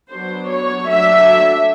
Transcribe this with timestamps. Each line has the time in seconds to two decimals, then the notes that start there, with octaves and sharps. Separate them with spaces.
0.10 F#3 B3 D4 C5
0.50 C#5
0.88 F#3 A3 D4 E5